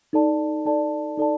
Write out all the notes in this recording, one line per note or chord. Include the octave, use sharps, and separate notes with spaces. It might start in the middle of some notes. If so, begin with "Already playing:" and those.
D#4 A4 D5 A5
D#4 A4 D5 A5
D#4 A4 D5 A5